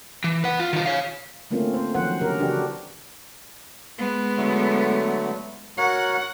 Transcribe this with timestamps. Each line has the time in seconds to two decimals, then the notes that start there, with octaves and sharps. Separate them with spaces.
0.24 E3
0.44 B4 F#5
0.59 F4
0.73 D#3 F4
0.86 C#5 F5
1.51 D3 A3 A#3 C4 C#4 F4
1.74 C4 C5
1.95 D#3 F3 F#3 C#4 C5 F#5
2.21 D3 C#4 G4 A#4
2.39 C#3 E3 D4 F#4 G4 F#5
3.98 G#3 B3
4.37 D3 F#3 A3
5.78 F#4 A#4 C#5 F#5